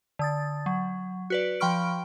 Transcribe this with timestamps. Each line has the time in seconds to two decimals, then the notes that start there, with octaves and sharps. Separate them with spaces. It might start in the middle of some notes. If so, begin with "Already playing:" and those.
0.19 D3 D#6 A6
0.66 F#3
1.30 F#4 B4 D5
1.60 F3 G5 B5 C#6 F6 D7